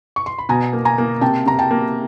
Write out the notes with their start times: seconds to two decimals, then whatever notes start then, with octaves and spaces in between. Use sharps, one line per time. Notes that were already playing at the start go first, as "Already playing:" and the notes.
0.16 C#6
0.26 C6
0.38 B5
0.49 B2 G#5 A#5
0.73 A#3
0.85 G#5 A#5
0.98 A#3
1.21 C3 G5 A5
1.46 C3 A#5
1.59 G5 A5
1.71 A#3